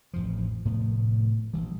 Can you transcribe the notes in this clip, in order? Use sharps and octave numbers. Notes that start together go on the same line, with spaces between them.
A1 F2 F3
F1 A2 A3 B3
A#1 E3 G3